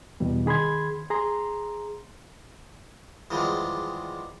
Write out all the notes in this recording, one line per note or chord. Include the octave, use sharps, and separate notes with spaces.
E2 B2 G3
D#3 G#4 B5 C6 G#6
G#4 A#5 C6
E2 D#3 F3 G3 G#3